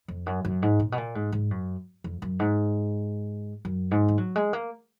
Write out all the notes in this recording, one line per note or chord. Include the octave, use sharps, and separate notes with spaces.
F2
F#2
F#2
G#2
A#2
B2
A#2
G#2
G#2
F#2
F2
F#2
G#2
F#2
G#2
G#3
F#3
G#3
A#3